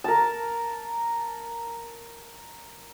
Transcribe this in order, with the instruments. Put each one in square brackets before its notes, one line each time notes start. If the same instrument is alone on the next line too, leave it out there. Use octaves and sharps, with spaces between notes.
[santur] A#4 A5